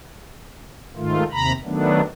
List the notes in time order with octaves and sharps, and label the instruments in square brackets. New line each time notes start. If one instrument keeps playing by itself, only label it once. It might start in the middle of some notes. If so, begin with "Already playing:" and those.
[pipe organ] G#2 D#3 A3 F4
D#2 C3 A#5 B5
D#3 F#3 A3 B3 D4